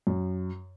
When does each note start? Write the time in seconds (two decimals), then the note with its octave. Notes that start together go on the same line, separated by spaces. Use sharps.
0.07 F#2